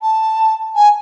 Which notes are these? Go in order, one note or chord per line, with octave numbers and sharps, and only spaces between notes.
A5
G#5